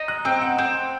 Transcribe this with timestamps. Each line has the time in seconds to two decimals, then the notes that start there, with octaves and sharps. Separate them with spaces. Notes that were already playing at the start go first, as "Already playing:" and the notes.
Already playing: D#4
0.08 F#6
0.25 C4 G5
0.41 F#5
0.58 C4 G5